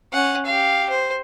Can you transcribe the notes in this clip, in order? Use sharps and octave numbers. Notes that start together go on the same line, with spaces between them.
C#4 F#5
G4 F5
C5